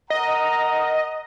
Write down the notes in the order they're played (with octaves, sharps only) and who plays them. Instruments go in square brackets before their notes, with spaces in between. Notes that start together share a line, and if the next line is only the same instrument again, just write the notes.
[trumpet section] A#4 F#5 A#5 [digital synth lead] D#5